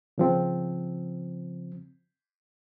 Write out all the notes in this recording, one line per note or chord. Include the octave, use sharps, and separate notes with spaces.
C#3 F3 C4